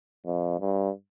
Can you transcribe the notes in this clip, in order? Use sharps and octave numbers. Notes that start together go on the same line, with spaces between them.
F2
G2